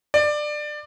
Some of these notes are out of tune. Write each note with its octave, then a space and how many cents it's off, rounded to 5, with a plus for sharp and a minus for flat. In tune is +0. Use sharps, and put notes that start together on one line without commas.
D5 +20